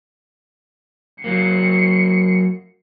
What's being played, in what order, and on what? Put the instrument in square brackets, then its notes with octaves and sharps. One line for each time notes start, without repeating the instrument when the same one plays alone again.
[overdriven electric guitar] F#3 A#3 [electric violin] C7 C#7